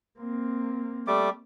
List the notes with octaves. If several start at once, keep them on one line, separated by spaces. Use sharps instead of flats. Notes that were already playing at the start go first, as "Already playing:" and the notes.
A#3 C4
G3 A3 D6